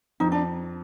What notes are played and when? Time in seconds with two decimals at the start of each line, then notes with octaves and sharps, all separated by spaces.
0.20 F2 D#4
0.32 D4